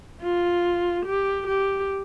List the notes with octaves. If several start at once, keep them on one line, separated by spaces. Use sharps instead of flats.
F4
G4
G4